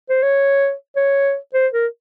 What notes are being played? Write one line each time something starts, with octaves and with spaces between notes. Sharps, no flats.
C5
C#5
C#5
C5
A#4